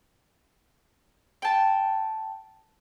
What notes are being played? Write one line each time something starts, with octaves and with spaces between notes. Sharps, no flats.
G5 A5